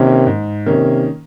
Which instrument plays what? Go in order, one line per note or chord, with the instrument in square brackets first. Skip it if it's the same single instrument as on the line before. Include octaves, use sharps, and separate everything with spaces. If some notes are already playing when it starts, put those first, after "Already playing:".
Already playing: [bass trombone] C3 [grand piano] D#3 A#3 C#4
[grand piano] G#2
[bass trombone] C3 [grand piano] D#3 A#3 C#4